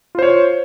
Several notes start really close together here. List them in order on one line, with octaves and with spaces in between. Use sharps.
F4 C5 C#5